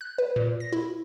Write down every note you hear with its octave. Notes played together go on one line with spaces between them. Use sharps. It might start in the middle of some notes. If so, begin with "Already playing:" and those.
F#6
B4
A#2
A#6
E4